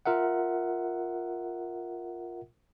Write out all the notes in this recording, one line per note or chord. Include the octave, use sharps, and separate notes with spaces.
F4 A#4 E5 F#5